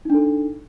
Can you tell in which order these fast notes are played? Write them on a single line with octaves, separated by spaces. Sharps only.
D#4 D4 A4